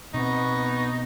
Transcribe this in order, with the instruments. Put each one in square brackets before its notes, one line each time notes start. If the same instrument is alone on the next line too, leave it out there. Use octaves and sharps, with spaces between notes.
[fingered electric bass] B2 C4 [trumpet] B3 [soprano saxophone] D#4 [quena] C#6